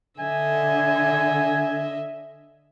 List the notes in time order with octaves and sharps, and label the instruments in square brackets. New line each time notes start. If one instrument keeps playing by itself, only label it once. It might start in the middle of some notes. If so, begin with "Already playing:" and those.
[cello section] D3 [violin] D#5 E5 [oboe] G#5